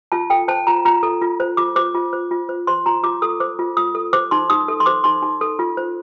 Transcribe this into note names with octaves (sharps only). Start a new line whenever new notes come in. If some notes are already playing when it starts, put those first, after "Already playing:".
F4 A5
A4 G5
C5 A5
F4 A#5
F4 A#5
A4
F4
C5
F4 D6
C5 D6
F4
C5
F4
C5
C5 C6
F4 A#5
F4 D6
A4 D#6
C5 D6
F4
F4 D#6
A4
C5 D6
D#4 C6
D#4 D#6
A4
C6
C5 D6
D#4 C6
D#4
A4
F4
C5